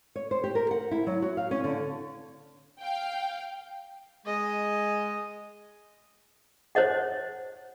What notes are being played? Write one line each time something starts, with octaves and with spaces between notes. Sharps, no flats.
C#5
C5
G4
A#4
F#5
E4
F#3
F#4
F5
C#4
D3
F5 G5
G#3 D#5
C5 C#5 D#5 F#5